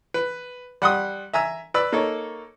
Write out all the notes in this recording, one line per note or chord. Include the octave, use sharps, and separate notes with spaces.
B4
G3 F#5 C6 D#6
E5 G#5 A#5 E6
B4 D5 B5 E6
A#3 D#4 A4 C#5